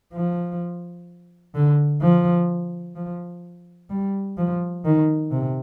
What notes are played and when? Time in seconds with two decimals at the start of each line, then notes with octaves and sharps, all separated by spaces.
0.14 F3
1.55 D3
2.01 F3
2.95 F3
3.90 G3
4.37 F3
4.85 D#3
5.31 C3